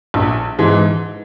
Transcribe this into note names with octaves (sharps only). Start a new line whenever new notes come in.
A#1
G#2 E3